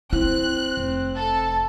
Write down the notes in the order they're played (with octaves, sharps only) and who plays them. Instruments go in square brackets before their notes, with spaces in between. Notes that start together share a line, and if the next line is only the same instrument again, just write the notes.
[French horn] C4 [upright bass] E4 [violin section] F#6
[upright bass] F1
[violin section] A4 A5